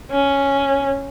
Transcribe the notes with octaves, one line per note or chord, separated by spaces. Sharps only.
C#4